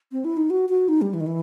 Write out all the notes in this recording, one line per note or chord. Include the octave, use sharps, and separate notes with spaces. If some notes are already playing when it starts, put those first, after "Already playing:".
C4
E4
D#4
F#4
F#4
D#4
G3
E3
D#3
E3